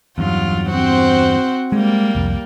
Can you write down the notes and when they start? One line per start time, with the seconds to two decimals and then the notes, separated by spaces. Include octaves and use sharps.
0.18 E2 G2 F#3 F4
0.70 C4 F#4 C5
1.72 G3 G#3 A#3
2.15 C2 F2